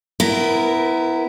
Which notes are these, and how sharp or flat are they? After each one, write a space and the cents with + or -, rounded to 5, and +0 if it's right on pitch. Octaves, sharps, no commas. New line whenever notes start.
B3 +25 E4 +0 A#4 +0